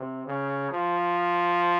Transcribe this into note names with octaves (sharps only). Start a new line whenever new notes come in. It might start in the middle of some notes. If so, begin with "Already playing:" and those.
Already playing: C3
C#3
F3